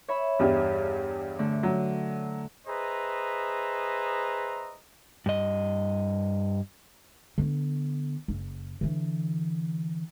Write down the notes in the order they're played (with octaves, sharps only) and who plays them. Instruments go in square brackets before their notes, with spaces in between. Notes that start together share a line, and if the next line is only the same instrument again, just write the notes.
[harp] C#5 E5 B5
[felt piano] E2 G2 G3
[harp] D3 A3
[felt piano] F#3
[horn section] G#4 B4 C5 D#5 E5 A#5
[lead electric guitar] G2 D#5
[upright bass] D3 B3
F#1
D3 E3